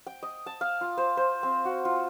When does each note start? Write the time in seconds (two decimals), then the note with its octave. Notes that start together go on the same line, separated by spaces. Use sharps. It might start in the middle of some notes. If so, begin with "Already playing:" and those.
0.07 G5
0.23 D#5
0.46 A5
0.61 F5
0.81 F4
0.98 C5
1.17 C5
1.43 C4
1.65 F#4
1.85 F4